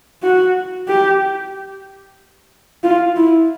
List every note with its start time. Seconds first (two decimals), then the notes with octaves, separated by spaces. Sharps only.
0.23 F#4
0.88 G4
2.84 F4
3.16 E4